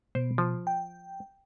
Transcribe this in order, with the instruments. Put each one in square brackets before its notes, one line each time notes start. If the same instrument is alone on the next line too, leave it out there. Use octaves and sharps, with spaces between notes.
[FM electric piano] B2 [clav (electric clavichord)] C5
[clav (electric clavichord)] F3
[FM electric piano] G5